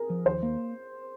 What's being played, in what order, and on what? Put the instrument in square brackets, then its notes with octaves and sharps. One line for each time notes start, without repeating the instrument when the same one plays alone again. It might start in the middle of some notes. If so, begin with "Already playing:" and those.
Already playing: [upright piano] G#4 A#4
[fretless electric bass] F3
[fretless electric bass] D#2 [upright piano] C5
[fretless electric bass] A#3